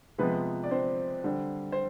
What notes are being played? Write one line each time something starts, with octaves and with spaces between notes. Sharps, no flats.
C3 F3 G#3 B3 B4
D5
C4 C5
D3 G3
C5